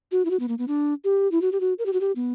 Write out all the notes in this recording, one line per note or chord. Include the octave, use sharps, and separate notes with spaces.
F#4
E4
F#4
B3
A#3
B3
D4
G4
E4
F#4
G4
F#4
A#4
G4
F#4
G4
B3